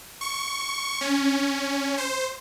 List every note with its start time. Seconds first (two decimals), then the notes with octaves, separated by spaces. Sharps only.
0.21 C#6
1.01 C#4
1.98 C5